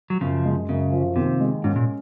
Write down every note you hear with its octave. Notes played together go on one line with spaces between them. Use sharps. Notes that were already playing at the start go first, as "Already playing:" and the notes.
F#3
F#2 C#3 F3
G#3
F#2 C#3
F3
D#2 C3
G#3
G#2 C#4
A#2